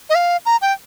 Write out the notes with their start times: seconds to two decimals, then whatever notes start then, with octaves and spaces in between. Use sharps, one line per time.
0.10 D#5
0.15 F5
0.46 A#5
0.62 G5